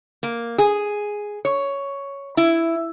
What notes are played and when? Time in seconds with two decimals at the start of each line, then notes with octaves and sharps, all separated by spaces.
0.23 A#3
0.58 G#4
1.45 C#5
2.37 E4